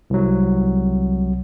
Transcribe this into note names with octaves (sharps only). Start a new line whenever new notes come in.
C2 F#3